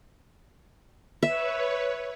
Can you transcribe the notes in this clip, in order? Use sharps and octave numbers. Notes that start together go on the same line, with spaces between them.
B4 C#5 E5